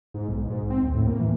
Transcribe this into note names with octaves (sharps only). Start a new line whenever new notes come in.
G#2
B1
G#2
C4
D2
A2
A#3
E3